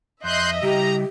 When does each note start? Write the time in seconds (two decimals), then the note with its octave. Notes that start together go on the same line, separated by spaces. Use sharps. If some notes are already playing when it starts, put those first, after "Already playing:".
0.24 F2 D#5 E5 C6 F#6 G6
0.63 C#3 G3 E4 G4 A#5